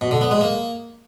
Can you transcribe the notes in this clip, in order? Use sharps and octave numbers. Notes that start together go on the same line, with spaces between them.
B2
D3
B3
G#3
A#3